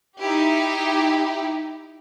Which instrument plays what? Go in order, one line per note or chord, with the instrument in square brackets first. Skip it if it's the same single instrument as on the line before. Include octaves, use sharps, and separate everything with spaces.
[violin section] D#4 E4 G4